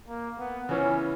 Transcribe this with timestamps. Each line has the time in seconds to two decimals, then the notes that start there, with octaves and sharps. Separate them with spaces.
0.08 A#3
0.39 B3
0.69 C#3 E3 B3 C#4